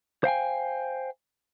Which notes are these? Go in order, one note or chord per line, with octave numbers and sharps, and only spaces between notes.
C5 F5 G5 G#5